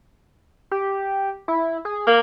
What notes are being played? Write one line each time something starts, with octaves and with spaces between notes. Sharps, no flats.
G4
E4
G#4
A#3 A#4